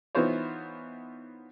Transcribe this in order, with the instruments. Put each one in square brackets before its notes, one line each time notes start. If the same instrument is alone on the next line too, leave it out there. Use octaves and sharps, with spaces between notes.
[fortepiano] E3 B3 D#4 F4 C5 C#5